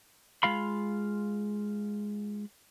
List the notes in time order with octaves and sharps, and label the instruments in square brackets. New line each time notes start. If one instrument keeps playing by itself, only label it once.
[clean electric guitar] G#3 F4 F5 B5